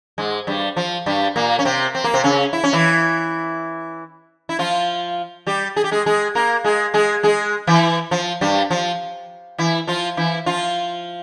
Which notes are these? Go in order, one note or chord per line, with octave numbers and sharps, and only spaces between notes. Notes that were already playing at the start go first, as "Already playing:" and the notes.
G#2 G#3
G2 G3
F3
G2 G3
A#2 A#3
C#4
C3 C4
C4
A#3
C3 C4
C#3 C#4
E4
C#4
E3 E4
E4
F3 F4
G3 G4
G#4
G4
G#3 G#4
G#3 G#4
A#3 A#4
G#3 G#4
G#3 G#4
G#3 G#4
E3 E4
F3
G2 G3
F3
E3 E4
F3 F4
E3 E4
F3 F4